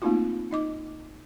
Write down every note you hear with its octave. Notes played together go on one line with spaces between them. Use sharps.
A3 A#3 C4 D#4 F4 F#4
D#4 D#5 D6